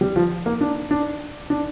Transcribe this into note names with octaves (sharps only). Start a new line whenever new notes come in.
G3
F3
A#3
D4
D4
D4